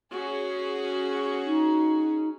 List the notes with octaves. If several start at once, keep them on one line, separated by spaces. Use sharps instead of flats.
C#4 F#4 G#4
D#4